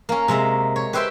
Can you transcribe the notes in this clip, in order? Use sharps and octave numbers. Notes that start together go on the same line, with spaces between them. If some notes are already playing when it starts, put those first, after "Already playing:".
A#3 C#4
C3 G#3 E5 A#5
C#5
G4 B4 C5 E5 G5 C6